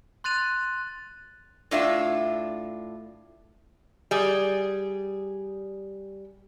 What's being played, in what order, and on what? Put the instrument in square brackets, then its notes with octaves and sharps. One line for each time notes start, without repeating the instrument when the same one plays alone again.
[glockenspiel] C6 F#6 A6 D#7 F7
[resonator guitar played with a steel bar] A2 D4 F4 E5
G3 G#4